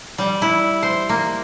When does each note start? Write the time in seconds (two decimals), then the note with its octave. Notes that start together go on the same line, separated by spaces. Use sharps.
0.18 G3
0.42 E4
0.83 C5
1.09 A#3